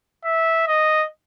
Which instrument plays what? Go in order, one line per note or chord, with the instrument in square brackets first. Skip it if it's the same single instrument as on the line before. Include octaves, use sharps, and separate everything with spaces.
[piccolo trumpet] E5
D#5